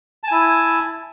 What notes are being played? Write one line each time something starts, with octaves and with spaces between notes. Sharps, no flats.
E4 G#5 A5